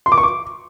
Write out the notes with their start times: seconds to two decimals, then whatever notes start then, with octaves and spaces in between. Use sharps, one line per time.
0.06 C6
0.12 D6
0.18 C#6
0.23 D6